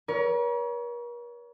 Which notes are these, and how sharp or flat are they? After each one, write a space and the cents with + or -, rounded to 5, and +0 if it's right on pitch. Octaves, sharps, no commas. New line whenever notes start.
A#4 +45 C#5 +30